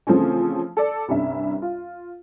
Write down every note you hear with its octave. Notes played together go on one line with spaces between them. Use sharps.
C#3 E3 F3 A3 C4 C#4
A4 D5
C2 G2 C#4 E5
F4